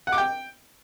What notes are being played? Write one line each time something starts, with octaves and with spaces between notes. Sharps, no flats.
F#5
D6
G5